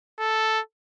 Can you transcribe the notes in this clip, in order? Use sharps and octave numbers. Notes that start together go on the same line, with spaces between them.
A4